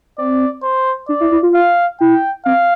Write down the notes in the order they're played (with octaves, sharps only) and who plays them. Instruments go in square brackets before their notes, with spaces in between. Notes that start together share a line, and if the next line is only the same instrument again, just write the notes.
[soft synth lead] C4 [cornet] D5
[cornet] C5
[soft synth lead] D4 [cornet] D5
[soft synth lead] E4
E4
F4
[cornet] F5
[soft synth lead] E4 [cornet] G5
[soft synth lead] C4 [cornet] F5